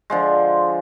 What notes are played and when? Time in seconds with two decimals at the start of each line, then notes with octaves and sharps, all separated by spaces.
0.10 D3 F3 G#3